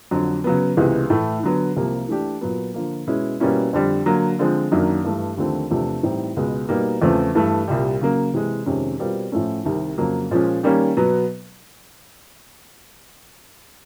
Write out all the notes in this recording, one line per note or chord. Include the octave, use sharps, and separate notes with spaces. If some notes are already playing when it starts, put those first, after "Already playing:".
F2 D3 F#3
C#3 F#3 B3
C#2 C3 E3 G#3 B3
A2 E3 A3
D3 F#3 B3
C2 C3 F3 A#3
E3 A3 D4 G4
A#2 F#3 B3
D3 F3 A#3
B2 G#3 C#4 E4
B2 G3 A#3 C#4 E4
F2 D3 G3
D3 F#3 A#3
D3 F3 G#3 C4
F#2 D#3 F#3 A#3 D4
G2 E3 A3
D#2 D3 F3 A3 C4
E2 C3 F3 A3 D4
A2 E3 G3 C4 D#4
C#2 B2 G#3 B3
B2 G3 A#3 D#4
E2 C#3 F3 A3 C4
G2 E3 A3
C2 A#2 G3
C#3 F#3 A#3
C3 E3 G#3
F2 C3 D#3 G#3 C#4
B2 G3 C4 F4 A#4
A2 F3 A3 C#4
C2 C3 D#3
F2 C#3 F#3 A#3
A#2 F3 G#3 C#4
D#3 G3 A#3 C#4
B2 F#3 B3